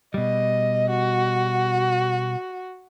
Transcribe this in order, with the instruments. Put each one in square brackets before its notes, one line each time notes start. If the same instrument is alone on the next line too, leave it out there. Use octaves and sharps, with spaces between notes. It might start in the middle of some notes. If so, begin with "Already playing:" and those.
[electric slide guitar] B2 G3 [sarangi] D#5
[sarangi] F#4